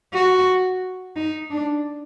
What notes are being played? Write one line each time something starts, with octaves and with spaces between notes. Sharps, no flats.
F#4
D#4
D4